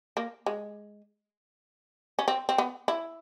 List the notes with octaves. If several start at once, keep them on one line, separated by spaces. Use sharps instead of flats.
A#3
G#3
C#4
C4
C4
B3
E4